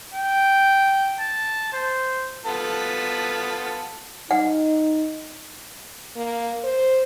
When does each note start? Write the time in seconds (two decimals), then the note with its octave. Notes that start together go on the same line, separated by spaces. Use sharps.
0.14 G5
1.19 A5
1.73 C5
2.45 B3 F4 A4
4.31 D#4 F#5
6.16 A#3
6.64 C5